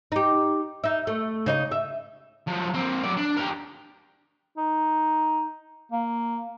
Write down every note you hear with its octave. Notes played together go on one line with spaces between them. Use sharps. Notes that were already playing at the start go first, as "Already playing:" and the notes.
D#4 G4
D#4 E5
A3
C#3 D#4 D#5
E5
F3 F#3
A#3 C4
F#3 D5
D4
G4 A#4
D#4
A#3